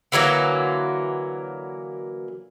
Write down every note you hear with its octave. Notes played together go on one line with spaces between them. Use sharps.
D3 E3 F#3 A#3